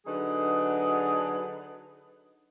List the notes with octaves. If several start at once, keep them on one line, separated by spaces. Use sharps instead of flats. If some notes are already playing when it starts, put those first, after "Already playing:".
D3 F#3 D#4 G#4 B4